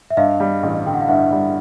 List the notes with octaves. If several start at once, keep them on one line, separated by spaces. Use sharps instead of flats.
E5
G2 D#5 F5
G3
A1
D3 G5
F#5
F5
G2 E5 F#5
G3